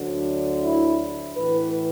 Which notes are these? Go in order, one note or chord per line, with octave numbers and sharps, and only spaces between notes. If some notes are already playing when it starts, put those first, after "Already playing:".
Already playing: D2 D3 F#3
E4
A2 E3 B4